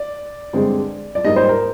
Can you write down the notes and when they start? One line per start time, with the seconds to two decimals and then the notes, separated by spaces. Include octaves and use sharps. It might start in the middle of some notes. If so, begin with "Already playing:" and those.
Already playing: D5
0.53 G2 D3 G#3 C4
1.15 D5
1.25 G#2 G3 A#3 D#5
1.36 C5
1.49 A#4